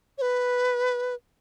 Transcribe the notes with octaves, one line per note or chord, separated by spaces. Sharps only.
C#5
B4